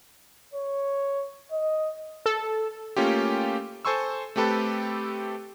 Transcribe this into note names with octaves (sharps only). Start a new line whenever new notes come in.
C#5
D#5
A4
A3 A#3 C#4 F4 G4
A4 C5 G#5 C6 C#6 E6
A3 C4 G4 A4 B4